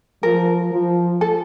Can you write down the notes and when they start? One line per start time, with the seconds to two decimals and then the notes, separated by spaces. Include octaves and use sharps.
0.23 F3 A#4
0.72 F3
1.21 A4